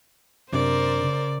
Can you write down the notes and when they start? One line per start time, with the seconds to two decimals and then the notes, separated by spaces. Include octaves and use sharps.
0.53 F#2 C3 D4 A#4 C5 D5
0.97 C#3